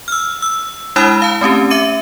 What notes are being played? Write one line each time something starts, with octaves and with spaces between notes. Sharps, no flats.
E6 F6
E6
G#3 D4 E4 B5 D#6 F6
F5 A5
A3 C4 C#4 G4
E5 D6 C#7 D#7